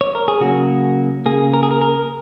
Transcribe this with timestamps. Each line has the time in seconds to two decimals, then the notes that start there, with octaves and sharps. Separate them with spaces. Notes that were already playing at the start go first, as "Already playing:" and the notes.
0.01 C#5
0.15 A#4
0.28 G#4
0.40 C#3 F#3 A#3 F#4
1.26 C#3 A#3 G#4
1.54 A#4
1.63 G#4
1.71 A#4
1.81 A#4